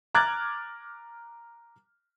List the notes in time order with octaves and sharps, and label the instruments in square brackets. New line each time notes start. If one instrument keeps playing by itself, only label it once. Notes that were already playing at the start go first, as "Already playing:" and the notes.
[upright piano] A#5 D6 F6 F#6 G#6 A6